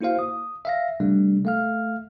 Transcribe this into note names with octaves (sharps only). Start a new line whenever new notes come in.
A#3 E4 F#4 C5 F5
D#6
E5 F5 A#6
C3 G3 A3 D4
A3 F5 F6